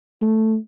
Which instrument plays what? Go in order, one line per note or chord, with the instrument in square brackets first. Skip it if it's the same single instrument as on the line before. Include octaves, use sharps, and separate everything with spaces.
[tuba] A3